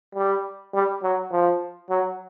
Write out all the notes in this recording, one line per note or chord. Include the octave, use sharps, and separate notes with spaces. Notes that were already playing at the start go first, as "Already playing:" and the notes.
G3
G3
F#3
F3
F#3